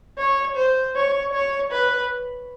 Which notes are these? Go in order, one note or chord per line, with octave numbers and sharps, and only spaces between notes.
C#5
C5
C#5
C#5
B4